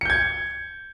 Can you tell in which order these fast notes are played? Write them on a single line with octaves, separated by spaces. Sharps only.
C#7 G6 G#6